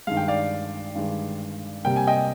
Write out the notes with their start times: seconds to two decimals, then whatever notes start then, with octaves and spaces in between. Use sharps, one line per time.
0.07 G2 D#3 G#3 F5
0.17 G5
0.28 D5 F5
0.95 G2 D#3 G#3
1.84 C3 G3 A#3 G5
1.96 G#5
2.07 D#5 G5